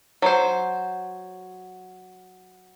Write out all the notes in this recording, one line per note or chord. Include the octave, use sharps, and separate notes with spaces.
F#3 C5